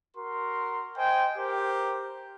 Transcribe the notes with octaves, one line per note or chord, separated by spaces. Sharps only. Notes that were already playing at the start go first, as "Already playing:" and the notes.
F#4 A#4 C6
C5 D#5 G5 G#5
G4 A#4 C5